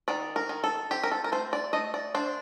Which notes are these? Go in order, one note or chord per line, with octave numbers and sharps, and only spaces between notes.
D#3 D5
A#4
D#3
A4
C4 G4
A#4
A4
A#4
A3 C5
D5
A3 D#5
D5
D4 C5